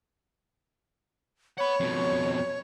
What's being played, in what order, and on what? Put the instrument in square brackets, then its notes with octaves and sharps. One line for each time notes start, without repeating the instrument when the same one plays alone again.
[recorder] C#5 [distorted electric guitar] F#5 B5
[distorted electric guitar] F2 B2